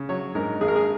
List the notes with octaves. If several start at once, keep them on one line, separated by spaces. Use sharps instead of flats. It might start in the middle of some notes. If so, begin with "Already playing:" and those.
Already playing: C#3
F#3 C#5
G#2 A#4
G#1 G#4
A#4
G#4